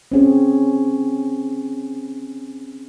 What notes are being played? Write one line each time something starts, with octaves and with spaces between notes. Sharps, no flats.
C4 C#4 G#4